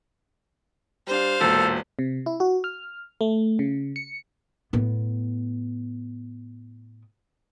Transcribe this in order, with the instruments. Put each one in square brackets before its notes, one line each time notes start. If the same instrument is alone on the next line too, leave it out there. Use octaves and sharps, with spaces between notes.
[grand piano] G3 D4 [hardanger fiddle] C5 F5
[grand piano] E1 A#2 [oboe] A4
[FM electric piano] C3
E4
F#4
F6
A3
C#3
C#7
[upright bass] A2 B3